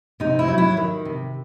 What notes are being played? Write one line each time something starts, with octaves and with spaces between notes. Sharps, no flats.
C3 D#4
E4
F#3
E4
D#3
C3